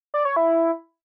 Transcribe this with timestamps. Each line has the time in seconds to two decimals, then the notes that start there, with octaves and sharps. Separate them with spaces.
0.14 D5
0.25 C#5
0.36 E4